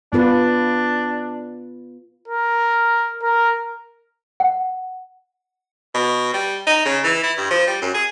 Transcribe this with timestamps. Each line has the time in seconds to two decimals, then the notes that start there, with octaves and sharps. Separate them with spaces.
0.13 B3 D4 F4 B4
2.28 A#4
3.22 A#4
4.40 F#5
5.94 B2
6.33 G3
6.67 D#4
6.85 C#3
7.04 E3
7.23 E4
7.37 G2
7.51 F3
7.67 G3
7.81 F#2
7.94 G#4